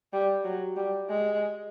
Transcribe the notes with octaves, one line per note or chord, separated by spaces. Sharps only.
G3
F#3
G3
G#3